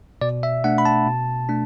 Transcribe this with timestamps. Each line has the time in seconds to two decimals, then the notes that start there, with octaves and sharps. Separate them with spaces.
0.21 B2 D5
0.43 E5
0.64 A3 D4 F#5
0.78 B5
0.85 A5
1.06 B2
1.49 A3 D4